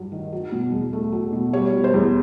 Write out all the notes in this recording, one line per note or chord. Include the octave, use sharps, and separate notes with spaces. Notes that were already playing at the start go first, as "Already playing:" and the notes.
Already playing: G2 F#3
D#3
F#3
B2
E2
A3
F#3
B2
G3 C#5
B2
C5
E2